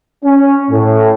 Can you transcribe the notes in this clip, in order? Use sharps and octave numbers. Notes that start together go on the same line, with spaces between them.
C#4
A2